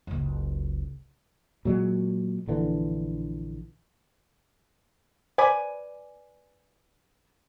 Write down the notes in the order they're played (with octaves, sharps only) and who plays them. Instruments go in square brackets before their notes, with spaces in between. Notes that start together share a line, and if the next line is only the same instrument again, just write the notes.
[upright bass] F#1 C#2
[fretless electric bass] A#2 F#3 G#3
A#1 D3 E3
[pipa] B4 D5 G#5 [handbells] C5